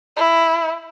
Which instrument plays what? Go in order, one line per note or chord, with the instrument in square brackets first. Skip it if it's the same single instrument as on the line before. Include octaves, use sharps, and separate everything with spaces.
[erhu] E4